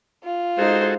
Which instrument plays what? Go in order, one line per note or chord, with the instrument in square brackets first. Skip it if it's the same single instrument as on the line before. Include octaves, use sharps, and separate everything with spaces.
[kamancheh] F4
[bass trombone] G#3 [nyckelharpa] D#4 C5 [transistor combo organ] F#4 G#4 A4